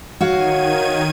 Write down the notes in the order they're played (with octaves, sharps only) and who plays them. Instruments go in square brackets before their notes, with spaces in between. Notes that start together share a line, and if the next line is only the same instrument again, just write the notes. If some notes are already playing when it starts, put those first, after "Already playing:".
[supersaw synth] D#3 G#6 D#7 [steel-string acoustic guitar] F#4 C#5 F5